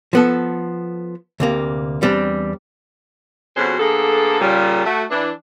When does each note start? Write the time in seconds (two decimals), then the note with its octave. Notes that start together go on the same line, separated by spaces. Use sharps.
0.13 F3 B3 A4
1.40 D2 C3 A#3
2.02 E2 G3 C4 D4
3.57 F2 B2 C#4 F#4 G#4 C5
3.80 D3 A#3 B3 G#4 A4
4.41 A#2 C#3 G3
4.85 A3 F#4
5.11 E3 D4